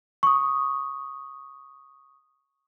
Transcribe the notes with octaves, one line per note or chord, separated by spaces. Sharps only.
C#6 D#6